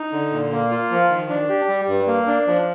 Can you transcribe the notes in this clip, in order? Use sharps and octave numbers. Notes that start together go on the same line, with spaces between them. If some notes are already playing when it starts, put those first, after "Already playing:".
Already playing: D#4
D3
A#2
A#3
F4
F3
D#3
D4
G4
G3
G2
A#3
D4
F3